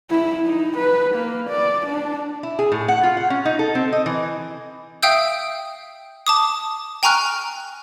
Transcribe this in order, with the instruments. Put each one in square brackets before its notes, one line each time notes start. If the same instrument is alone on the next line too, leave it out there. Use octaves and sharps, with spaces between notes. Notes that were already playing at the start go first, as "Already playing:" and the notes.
[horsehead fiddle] E4
D#4
B4
A#3
D5
D4
[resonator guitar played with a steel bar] E4
G#4
A2
F#5
F4
F#5
C#4
D#4
A4
C4
D#5
E3
[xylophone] E5 F5 G5 D#6 E6 G6
A5 D6 D#6
G5 G#5 A#5 C#6 F6 F#6